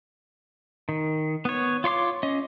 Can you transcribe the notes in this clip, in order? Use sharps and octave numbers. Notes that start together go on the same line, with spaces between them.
D#3
B3 C#5
F4 C#5 C6 D6
C#4 D#5